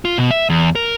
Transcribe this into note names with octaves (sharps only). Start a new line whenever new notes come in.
F4
B2
E5
E2
A#4